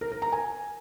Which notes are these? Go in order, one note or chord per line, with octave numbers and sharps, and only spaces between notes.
A#4
A#4
A#5
G#5